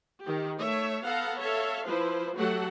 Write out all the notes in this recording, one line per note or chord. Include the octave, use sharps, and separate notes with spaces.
D#3 G4
A3 C#5 E5
B3 A4 F5 F#5 A#5
A4 C#5 E5 F5
F3 E4 B4 C5
F#3 A3 F#4 G4 A4 F#5